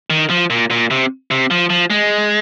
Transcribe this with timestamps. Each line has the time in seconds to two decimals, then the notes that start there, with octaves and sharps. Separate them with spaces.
0.10 D#3
0.30 F3
0.50 A#2
0.71 A#2
0.91 C3
1.31 C3
1.51 F3
1.70 F3
1.90 G#3